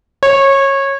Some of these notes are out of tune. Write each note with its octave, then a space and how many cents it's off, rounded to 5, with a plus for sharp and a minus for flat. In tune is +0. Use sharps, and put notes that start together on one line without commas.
C#5 -20